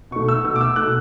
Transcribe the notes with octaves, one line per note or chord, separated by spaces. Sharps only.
B2 A3 C#6
E6
B2 A3 E6
D6
E6
B2 A3 F#6